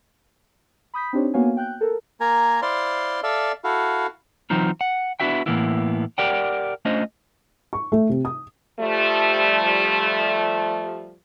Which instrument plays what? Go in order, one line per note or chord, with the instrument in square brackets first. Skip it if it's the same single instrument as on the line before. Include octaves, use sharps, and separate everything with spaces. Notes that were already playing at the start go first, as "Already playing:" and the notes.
[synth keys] B5 D#6 G6 B6
C4 D4 D#4 G4 C5 C#5
A#3 B3 F#4 C#5 F5 G#5
G5 F#6 G6
A4 A#4
[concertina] A#3 A#4 G#5 A#5
E4 C5 D5 F5 C6
A4 D5 E5 F5
E4 F#4 A4 F5
[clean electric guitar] E3 F#3 C4 D#4 F4
F#5
B3 D4 E4 F#4 E5 G5
A2 E3 F#3 A#3 B3 E4
G4 A#4 D5 F#5 G5
A3 C#4 D4 F4 C5 D#5
[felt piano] C#6
A3
C3
D#6
[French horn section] F3 G3 A3